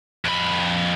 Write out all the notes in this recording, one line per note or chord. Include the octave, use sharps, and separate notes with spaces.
F2 B5